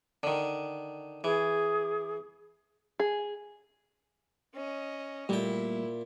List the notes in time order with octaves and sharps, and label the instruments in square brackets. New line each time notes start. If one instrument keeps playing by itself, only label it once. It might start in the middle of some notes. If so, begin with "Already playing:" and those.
[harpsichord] D3 D#3
[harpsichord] E3 [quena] G#4
[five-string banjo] G#4
[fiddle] C#4 D#5
[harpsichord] A#2 G5 [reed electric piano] G3 A3 A#3 [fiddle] E4